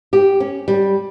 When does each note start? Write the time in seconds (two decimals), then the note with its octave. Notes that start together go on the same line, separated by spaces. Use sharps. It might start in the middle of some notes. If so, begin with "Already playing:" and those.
0.13 G4
0.40 C#4
0.68 G3